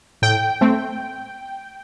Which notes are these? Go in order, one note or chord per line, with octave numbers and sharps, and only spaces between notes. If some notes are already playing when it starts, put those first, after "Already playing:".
A2 G5
A3 C4